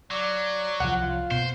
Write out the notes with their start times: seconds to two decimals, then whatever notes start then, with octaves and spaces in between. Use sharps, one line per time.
0.11 F#3 D5
0.80 C2 F3 F#5
1.01 F4
1.31 B2 C5